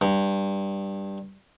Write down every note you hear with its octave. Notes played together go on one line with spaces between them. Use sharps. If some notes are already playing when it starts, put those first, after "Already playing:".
G2